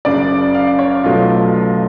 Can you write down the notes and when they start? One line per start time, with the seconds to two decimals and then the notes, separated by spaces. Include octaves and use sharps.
0.05 F#1 F#2 C#3 D5
0.54 F5
0.79 C#5
1.04 B1 B2 F#3 A3 F4
1.54 F4